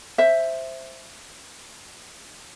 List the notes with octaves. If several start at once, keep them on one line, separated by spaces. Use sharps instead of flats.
C5 E5